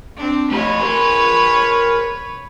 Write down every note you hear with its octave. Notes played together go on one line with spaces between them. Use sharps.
C4 D4
A3 G4 B4 C#5
A#4 C5